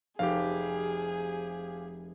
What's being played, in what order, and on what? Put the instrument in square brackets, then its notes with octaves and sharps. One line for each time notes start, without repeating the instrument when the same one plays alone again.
[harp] F1 [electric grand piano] G4 F5 [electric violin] G#4